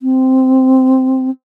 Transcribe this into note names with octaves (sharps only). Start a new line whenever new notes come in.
C4